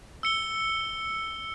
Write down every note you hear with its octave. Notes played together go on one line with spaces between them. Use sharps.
E6 C#7 G7